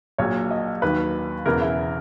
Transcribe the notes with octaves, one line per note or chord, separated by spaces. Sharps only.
A#1 A#2 F#3 C#5
D#5
D#2 D#3 F#3 B4
E1 E2 C#3 E3 A#4
E4